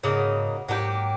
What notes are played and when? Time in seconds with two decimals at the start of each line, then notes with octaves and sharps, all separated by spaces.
0.03 G#2 C#3 F#3 A#3 D#4
0.69 G#2 F#3 A#3 D#4 G4